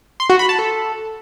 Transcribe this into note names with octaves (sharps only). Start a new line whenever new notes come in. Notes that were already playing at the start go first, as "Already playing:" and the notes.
C6
F#4
B5
A5
A4